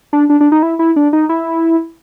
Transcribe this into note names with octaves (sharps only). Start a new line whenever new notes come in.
D4
D4
D4
D#4
E4
E4
D4
D#4
E4